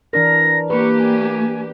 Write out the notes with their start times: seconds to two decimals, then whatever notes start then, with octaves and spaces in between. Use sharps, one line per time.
0.13 E3 D4 A#4 A#6
0.70 A#3 G4 B4 C#6
0.99 G#5